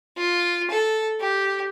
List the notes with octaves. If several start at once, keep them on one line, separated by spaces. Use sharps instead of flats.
F4
A4
G4